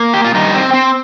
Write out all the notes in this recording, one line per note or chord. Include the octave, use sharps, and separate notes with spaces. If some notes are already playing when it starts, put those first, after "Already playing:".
Already playing: A#3
G4
F4
G2 D#3 G3 D#4
C4
C4